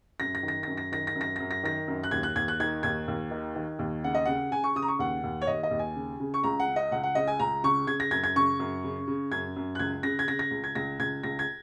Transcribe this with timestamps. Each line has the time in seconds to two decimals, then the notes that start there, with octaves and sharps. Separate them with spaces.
0.20 F#2 A#6
0.35 A#6
0.43 D#3
0.48 A#6
0.63 A#6
0.67 F#2
0.77 A#6
0.92 D#3 A#6
1.07 A#6
1.15 F#2
1.21 A#6
1.36 A#6
1.40 F#2
1.51 A#6
1.64 D#3 A#6
1.88 F#2
2.04 F#6
2.11 D#2 G#6
2.23 F#6
2.36 D#2 G#6
2.48 F#6
2.60 D#3 G#6
2.83 D#2 G#6
3.08 D#2
3.31 D#3
3.56 D#3
3.79 D#2
4.04 C#3 F#5
4.15 D#5
4.25 C#3 F#5
4.51 C#3 G#5
4.64 C#6
4.76 C#3 D#6
4.82 A#5
4.88 C#6
4.99 D#2 F#5
5.24 D#2
5.41 C#5
5.47 D#2 D#5
5.63 D#5
5.71 D#2
5.79 G#5
5.95 C#3
6.20 C#3
6.34 C#6
6.44 C#2 A#5
6.60 F#5
6.68 C#3
6.76 D#5
6.92 C#2 F#5
7.03 F#5
7.15 C#3 D#5
7.27 G#5
7.40 C#2 A#5
7.64 C#3 C#6
7.87 C#3 G#6
8.00 A#6
8.11 F#2 G#6
8.24 G#6
8.36 C#3 C#6
8.59 F#2
8.84 C#3
9.08 C#3
9.32 F#2 G#6
9.56 F#2
9.75 F#6
9.79 C#2 G#6
10.03 C#3 A#6
10.19 G#6
10.28 C#3 A#6
10.39 A#6
10.51 C#2
10.64 G#6
10.75 C#2 A#6
10.99 C#2 G#6
11.23 C#2 A#6
11.39 G#6